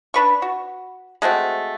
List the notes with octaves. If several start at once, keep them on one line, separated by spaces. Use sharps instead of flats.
D4 B4 C#6
F#4
G#3 A3 C4 F#4